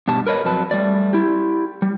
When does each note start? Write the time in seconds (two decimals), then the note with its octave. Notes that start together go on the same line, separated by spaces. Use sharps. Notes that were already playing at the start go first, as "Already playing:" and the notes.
0.08 G2 B2 G3 A5
0.27 A#4 B4 C#5 D#5
0.45 F2 F#3 B4 A5
0.71 G3 A3 D5
1.13 E4 G4
1.82 G3